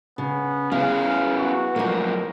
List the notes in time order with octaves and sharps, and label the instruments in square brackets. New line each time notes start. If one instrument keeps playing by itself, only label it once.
[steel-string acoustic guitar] C#3 [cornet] B3
[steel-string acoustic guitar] B3 [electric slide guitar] C#4 E4 G#4 [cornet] F5
[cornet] F#4
[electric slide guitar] F#2 A2 F3 [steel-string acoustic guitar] A#3 A#4